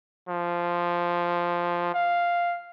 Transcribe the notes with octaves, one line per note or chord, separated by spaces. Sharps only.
F3
F5